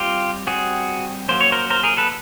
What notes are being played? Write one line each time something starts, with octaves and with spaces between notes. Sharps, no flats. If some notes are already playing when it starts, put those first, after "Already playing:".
Already playing: G3 C4 F4 G4
G3 C4 F#4 G#4
F#3 A#3 C#4 C5
C#5
A#4 C5
A#4 C5
G#4 A#4
A4 B4